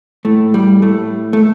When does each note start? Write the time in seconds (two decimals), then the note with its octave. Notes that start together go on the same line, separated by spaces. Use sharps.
0.25 A2 A3
0.54 G3
0.82 A2 A3
1.33 A3